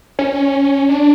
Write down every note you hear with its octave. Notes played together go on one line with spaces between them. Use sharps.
C#4
D4